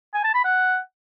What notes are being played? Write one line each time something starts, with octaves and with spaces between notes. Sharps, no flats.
G#5
A5
B5
F#5